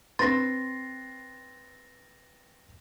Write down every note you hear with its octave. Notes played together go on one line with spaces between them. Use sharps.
C4 B4 C6 A6 A#6